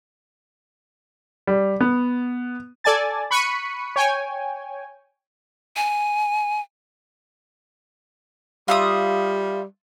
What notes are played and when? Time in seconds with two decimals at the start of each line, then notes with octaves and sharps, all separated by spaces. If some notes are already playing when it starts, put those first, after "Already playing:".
1.47 G3
1.81 B3
2.84 A4 D5 G#5 A5 A6
3.31 B5 C#6 F#6 B6 C#7 D#7
3.96 C#5 G5 G#5
5.76 G#5
8.68 G3 F4 E5 D#6